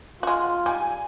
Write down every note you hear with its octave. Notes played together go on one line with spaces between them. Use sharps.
G#3 F4 F#4
G3 G#5